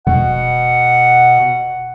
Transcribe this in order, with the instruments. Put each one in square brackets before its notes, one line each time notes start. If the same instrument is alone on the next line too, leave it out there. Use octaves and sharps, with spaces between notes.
[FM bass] E1 [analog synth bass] B2 [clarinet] F#5